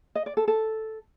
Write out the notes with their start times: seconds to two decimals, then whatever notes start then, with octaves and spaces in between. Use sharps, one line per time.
0.15 D#5
0.26 D5
0.37 A4
0.48 A4